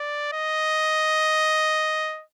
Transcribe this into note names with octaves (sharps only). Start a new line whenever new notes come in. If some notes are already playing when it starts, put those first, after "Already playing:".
Already playing: D5
D#5